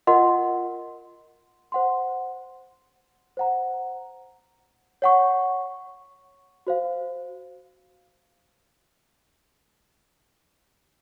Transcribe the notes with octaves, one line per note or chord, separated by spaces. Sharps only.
F4 A#4 D#5 F#5 C6
C5 F#5 C6
C5 F#5 A#5
C#5 F#5 C#6
F#4 C5 F5